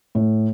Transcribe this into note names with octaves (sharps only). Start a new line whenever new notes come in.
A2